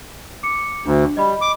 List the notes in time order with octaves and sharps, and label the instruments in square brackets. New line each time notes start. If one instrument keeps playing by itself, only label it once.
[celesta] D6 C#7
[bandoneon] D2 [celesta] D4
[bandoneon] G3 [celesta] D#5 B5
[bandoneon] D6